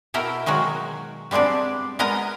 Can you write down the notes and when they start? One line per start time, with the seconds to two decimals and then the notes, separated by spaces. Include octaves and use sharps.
0.14 B2 E4 A#4 G5
0.46 D#3 F#3 G#3 F#4
1.31 G3 G#3 B3 C4 D4
1.99 G#3 B3 A#4 D#5 A#5